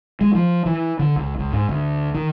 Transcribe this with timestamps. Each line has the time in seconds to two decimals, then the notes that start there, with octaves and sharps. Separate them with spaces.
0.21 G#3
0.35 F3
0.66 E3
0.99 D3
1.16 C#2
1.39 C#2
1.52 G#2
1.69 D2
2.15 D#3